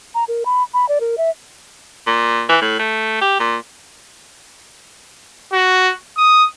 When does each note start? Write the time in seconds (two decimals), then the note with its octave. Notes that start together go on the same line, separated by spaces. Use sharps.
0.15 A#5
0.28 A#4
0.45 B5
0.74 B5
0.89 D5
1.00 A#4
1.18 E5
2.07 A#2
2.49 E3
2.61 A2
2.79 A3
3.21 G4
3.40 A#2
5.53 F#4
6.18 D#6